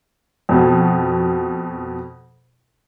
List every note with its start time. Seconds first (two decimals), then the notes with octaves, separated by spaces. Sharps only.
0.49 F2 B2